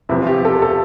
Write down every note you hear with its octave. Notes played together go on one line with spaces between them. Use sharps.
E2 C3 F3 E4
F4
G4
A4
A4